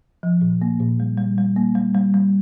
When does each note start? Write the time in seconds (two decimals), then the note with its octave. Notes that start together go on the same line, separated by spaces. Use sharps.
0.23 F3
0.41 A#2
0.62 A#3
0.80 A#2
1.00 G3
1.18 G3
1.38 G3
1.56 A#3
1.75 G3
1.94 G3
2.14 G3